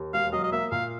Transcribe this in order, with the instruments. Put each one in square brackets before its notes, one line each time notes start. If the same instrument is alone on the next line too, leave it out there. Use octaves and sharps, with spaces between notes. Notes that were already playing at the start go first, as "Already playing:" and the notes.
Already playing: [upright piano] D#2
[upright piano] E1 [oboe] F5
[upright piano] F#3 [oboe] D#5
[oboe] D#5
[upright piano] A#3 [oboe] E5
[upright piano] A#2 [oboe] F5